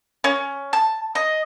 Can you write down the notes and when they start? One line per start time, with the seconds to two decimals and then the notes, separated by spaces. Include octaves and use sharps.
0.24 C#4
0.73 A5
1.15 D#5